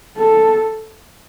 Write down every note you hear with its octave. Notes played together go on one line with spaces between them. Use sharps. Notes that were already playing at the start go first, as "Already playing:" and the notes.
A4